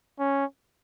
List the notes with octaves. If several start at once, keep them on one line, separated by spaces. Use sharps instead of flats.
C#4